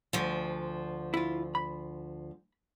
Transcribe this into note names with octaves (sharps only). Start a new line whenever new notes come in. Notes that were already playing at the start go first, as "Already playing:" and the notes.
D2 F3
E4 F4
B5